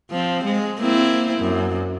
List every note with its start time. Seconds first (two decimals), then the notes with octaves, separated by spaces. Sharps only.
0.11 F3 C4
0.45 G#3
0.80 A#3 C4 E4
1.39 F#2